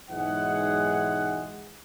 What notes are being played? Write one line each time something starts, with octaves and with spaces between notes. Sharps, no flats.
B1 G#2 E3 G#3 G#4 F#5